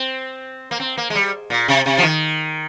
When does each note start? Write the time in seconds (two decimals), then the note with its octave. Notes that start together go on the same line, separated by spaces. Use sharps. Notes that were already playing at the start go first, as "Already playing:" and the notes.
Already playing: C4
0.71 A#3
0.80 C4
0.97 A#3
1.10 G#3
1.15 G3
1.50 A#2
1.68 C3
1.86 C3
1.98 F3
2.03 D#3